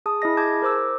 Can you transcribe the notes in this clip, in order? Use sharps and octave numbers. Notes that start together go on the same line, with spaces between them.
G#4 A5 D#6
E4 G#4 D#5 A#6
G#4 A5 D6 G6 G#6
A#4 C5 D6 E6